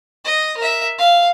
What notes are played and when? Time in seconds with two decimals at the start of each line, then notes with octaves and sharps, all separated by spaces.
0.25 D#5
0.57 A#4 E5
0.98 F5